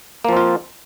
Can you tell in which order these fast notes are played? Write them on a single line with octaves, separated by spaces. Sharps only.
A#3 F3 C4 F4